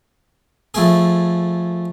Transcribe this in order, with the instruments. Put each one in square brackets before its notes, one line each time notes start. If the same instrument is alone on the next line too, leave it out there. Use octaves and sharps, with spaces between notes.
[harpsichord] F2 A3 G#4